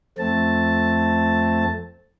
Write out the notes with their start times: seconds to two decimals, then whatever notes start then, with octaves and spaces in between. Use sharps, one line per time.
0.18 F2 A3 C4 A5